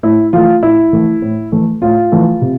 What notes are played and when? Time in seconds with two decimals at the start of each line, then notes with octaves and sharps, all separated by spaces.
0.03 A2 E4
0.33 E3 A3 F4
0.63 A2 E4
0.93 E3 A3
1.22 A2
1.52 E3 A3
1.82 A2 F4
2.12 E3 A3
2.41 C3